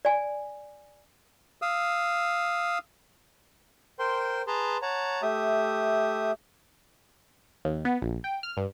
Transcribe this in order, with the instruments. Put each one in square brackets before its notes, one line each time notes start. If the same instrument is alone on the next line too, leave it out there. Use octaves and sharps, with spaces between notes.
[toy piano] D5 G#5
[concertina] F5 D#6 E6
[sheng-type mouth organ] A#4 C5 G5 C6
G#4 B4 A5 A#5 C6
C#5 F#5 A5 A#5
A3 G4 E5 D#6
[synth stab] D#2
B3
A#1
G5
F6
G2